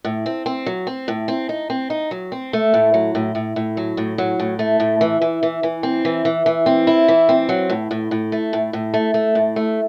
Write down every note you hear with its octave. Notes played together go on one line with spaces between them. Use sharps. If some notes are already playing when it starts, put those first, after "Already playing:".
A2
C4
C4
F#3
C4
A2
C4
D#4
C4
D#4
F#3
C4
A3
A2
F#3
A2
A2
A2
F#3
A2
F#3
A2
A3
A2
E3
E3
E3
E3
C4
E3
E3
E3
C4
E4
E3
C4
F#3
A2
A2
A2
A3
A2
A2
A3
A3
A2
A3